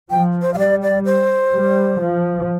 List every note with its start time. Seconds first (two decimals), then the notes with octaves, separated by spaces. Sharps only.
0.10 F3 G5
0.42 C5
0.54 F5
0.58 G3 D5
0.82 D5
1.05 C5
1.53 G3
2.01 F3